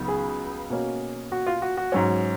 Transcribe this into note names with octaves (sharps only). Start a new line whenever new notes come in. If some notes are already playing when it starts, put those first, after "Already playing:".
Already playing: C#2 C#3 F#3 B3 D#4
G#4
B2 A#3 C#4
F#4
F4
F#4
F#4
G#2 F#3 C#4